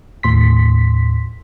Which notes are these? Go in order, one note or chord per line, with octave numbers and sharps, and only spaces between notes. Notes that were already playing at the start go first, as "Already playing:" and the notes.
D#2 A2 C6 B6